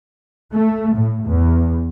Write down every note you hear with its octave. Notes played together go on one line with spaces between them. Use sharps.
A3
A2
E2